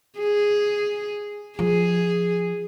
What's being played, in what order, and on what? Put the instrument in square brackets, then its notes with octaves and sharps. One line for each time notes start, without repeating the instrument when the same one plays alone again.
[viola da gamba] G#4
[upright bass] F3 [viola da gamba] G#4